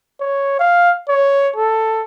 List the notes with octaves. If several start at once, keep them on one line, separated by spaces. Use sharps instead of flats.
C#5
F5
C#5
A4